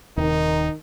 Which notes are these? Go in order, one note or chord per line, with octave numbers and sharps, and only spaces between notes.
D#1 D#2 C3 D#3 D#4